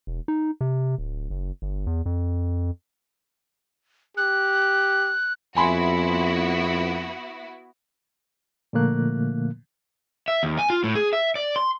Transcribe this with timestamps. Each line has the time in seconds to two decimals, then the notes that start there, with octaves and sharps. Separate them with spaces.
0.07 E1
0.28 D#4
0.61 C3
0.98 D1
1.30 F#1
1.62 G1
1.87 E2
2.06 F2
4.17 G4 F#6
5.56 F2 B3 E4 F#4 G#5 B5 C6
8.73 A#2 D3 F3 A3 A#3 F#6
10.28 E5
10.43 D#2
10.58 G#5
10.70 F4
10.84 A2
10.95 G#4
11.13 E5
11.36 D5
11.56 C6